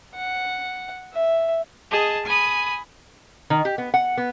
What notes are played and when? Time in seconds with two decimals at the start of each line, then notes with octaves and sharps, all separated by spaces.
0.15 F#5
1.13 E5
1.90 G#4 D#5 A5
2.25 G#5 B5 D#6
3.50 D#3
3.65 G4
3.78 B3
3.94 F#5
4.17 B3